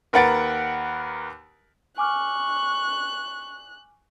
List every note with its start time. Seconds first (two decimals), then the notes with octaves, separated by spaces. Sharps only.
0.13 D#2 A#4 B4 F#5 A6 D7
1.98 G#5 C#6 D6 F6 F#6